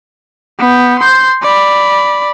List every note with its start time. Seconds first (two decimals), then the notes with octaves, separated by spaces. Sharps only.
0.59 B3 G6
0.99 C6 G6
1.42 D5 B5